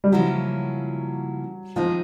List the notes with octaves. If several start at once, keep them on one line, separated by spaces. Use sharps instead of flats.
G3
C#3 F3 F#3 A#3 C#4 E4
D#3 F3 G#3 C4 D#4